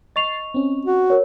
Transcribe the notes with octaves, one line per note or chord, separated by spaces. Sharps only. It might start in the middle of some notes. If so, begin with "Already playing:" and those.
D#5 C#6 A6 C7 F7
C4 C#4
F#4
A#4 C#5